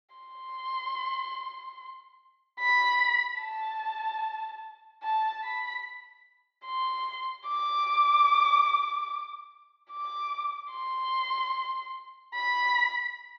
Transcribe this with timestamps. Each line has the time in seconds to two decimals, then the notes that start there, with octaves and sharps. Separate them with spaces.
0.16 C6
2.60 B5
3.41 A5
5.03 A5
5.44 B5
6.66 C6
7.47 D6
9.91 D6
10.72 C6
12.35 B5